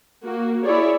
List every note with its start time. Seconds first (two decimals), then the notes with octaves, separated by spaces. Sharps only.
0.23 A#3 F#4
0.64 E4 G#4 C#5 D5